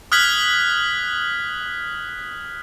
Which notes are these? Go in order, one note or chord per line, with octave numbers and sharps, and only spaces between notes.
D#6 F6 F#6 G#6 B6 F#7